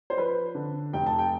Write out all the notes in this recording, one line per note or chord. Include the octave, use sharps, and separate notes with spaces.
C5
F3 B4
D3
F1 G5
A5
G5